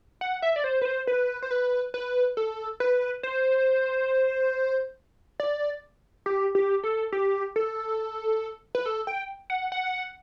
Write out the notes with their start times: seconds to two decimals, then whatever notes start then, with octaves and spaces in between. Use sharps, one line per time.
0.21 F#5
0.42 E5
0.56 D5
0.64 C5
0.81 B4
0.85 C5
1.07 B4
1.42 C5
1.51 B4
1.94 B4
2.37 A4
2.80 B4
3.23 C5
5.40 D5
6.26 G4
6.55 G4
6.84 A4
7.12 G4
7.56 A4
8.75 B4
8.86 A4
9.07 G5
9.50 F#5
9.72 F#5